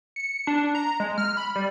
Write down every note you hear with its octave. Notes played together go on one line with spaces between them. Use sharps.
C#7
D4
A#5
G#3
F6
B5
G3